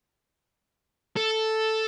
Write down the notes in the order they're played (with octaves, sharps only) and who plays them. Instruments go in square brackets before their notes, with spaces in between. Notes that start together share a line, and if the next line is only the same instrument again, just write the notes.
[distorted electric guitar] A4